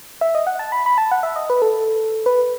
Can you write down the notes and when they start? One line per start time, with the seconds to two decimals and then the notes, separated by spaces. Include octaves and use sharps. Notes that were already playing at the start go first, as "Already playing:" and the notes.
0.21 E5
0.35 D#5
0.47 F#5
0.59 A5
0.72 B5
0.86 B5
0.98 A5
1.12 F#5
1.23 E5
1.36 D#5
1.50 B4
1.62 A4
2.26 B4